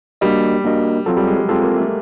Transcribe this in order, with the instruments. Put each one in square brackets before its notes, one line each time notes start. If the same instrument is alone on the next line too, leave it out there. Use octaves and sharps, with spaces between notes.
[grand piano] G3 [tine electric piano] A#3 D4 F#4 A#4 D#5
[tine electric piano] A#3 D4 F#4 A#4 D#5
[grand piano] F#3 [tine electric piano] C4 F4 A4
[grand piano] G3
G#3
G3
[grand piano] G#3 [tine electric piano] C4 F4 A4
[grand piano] A#3
A3